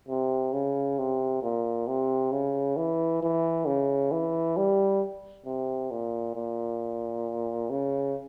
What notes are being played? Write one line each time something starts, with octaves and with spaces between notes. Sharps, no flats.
C3
C#3
C3
A#2
C3
C#3
E3
E3
C#3
E3
G3
C3
A#2
A#2
C#3